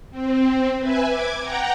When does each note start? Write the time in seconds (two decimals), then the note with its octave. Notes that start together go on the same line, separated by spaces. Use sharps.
0.11 C4
0.79 B4 E5 G#5
1.08 D6 G#6
1.40 F#5 G5 A#5